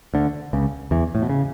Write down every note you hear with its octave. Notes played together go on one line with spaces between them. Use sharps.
D2 D3
C#2 C#3
E2 E3
A2
B2
C#3